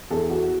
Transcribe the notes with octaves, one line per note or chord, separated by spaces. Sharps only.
E2 A4
F#4